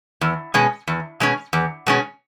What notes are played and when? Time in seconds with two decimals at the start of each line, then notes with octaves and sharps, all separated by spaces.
0.21 E2
0.54 B2 G#3 C#4
0.87 E2
1.20 B2 G#3 C#4
1.53 E2
1.86 B2 G#3 C#4